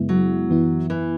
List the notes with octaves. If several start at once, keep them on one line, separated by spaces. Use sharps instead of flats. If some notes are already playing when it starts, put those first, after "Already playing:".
Already playing: F#2 C#3 G#3 B3 E4
F#3
F#2 E3 B3 E4
E3